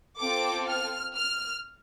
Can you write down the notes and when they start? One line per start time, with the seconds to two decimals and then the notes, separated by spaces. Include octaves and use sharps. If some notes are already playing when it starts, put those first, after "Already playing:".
0.18 C4 F4 A4 D6
0.68 F6
1.16 F6